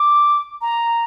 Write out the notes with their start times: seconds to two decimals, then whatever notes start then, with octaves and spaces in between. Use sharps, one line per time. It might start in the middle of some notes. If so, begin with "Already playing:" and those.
Already playing: D6
0.61 A#5